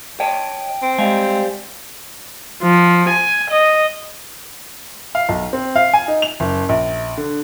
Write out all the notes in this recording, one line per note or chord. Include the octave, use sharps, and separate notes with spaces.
C#5 D#5 G5 A5
C4
G3 G#3 F5 G#5
F3
G#5
D#5
F5
B1
C4
F5
G#5
D#4
F7
F#1
A#1
D3